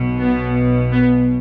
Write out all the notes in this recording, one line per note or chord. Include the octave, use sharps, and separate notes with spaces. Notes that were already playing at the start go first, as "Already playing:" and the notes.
Already playing: B1 B2
B3
B3